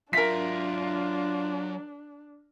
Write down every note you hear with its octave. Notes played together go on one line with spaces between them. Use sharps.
F#3 D4 F4 A#4 E5 B6